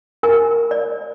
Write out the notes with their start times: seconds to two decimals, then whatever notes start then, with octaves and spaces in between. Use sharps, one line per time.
0.23 A#4 G#5
0.71 D5